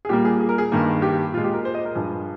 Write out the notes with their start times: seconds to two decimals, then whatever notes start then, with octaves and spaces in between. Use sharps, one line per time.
0.05 G#4
0.09 A#2 G3 A#3 G4
0.25 G#4
0.40 G#4
0.49 A#4
0.58 G#4
0.72 G2 D#3 A#3
1.02 G4
1.33 A#2 F4
1.37 G#3
1.44 G4
1.54 A#4
1.65 C5
1.74 D#5
1.85 A#4
1.95 G2 F3 G#3 G#4